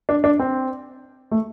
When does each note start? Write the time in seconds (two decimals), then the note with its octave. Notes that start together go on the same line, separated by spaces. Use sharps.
0.09 D4
0.24 D4
0.39 C4
1.31 A3